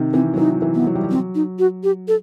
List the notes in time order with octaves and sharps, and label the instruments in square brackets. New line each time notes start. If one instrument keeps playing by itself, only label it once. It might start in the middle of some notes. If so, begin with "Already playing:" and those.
Already playing: [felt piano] C3 D#3
[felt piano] E3 [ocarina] C4
[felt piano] F#3
[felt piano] E3 [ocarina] D#4
[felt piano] E3
[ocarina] B3
[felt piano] F#3
G3
F#3
[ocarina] C4
D#4
F#4
G4
A4